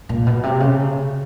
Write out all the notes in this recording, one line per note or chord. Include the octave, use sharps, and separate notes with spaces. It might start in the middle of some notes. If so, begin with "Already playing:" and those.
A#2
B2
C3
C#3